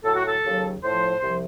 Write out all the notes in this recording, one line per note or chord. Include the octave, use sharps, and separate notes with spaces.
A2 F#3 A4
F#4
A4
D#2 C#3 F#3
A2 F3 C5
C2 C3 F3